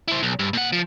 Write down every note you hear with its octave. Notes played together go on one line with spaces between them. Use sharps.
E4 C5
B1
G2
A#2 F#5
F3